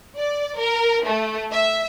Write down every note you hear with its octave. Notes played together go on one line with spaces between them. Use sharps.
D5
A#4
A3
E5